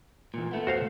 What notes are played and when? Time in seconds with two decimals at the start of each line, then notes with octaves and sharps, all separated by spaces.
0.34 A#2 E3
0.52 A3 B3
0.67 F#4 C5 F5